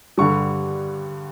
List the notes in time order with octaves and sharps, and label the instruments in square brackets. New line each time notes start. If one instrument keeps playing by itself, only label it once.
[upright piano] G2 D3 G3 C#6